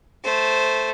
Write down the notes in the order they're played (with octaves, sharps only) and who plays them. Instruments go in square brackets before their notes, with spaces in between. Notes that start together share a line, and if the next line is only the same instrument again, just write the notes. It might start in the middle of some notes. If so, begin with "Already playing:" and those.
[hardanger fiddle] A3 C5